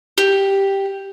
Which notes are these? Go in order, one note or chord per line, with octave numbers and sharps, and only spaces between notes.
G4